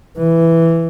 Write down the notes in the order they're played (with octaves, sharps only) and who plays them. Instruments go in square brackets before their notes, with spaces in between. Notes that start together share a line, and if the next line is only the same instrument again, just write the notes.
[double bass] E3